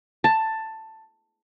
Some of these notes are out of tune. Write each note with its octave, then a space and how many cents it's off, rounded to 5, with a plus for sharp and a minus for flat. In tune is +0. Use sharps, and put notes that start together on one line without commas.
A5 +10